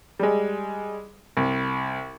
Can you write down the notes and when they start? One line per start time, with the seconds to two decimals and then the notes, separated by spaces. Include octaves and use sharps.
0.19 G3 G#3
1.37 C2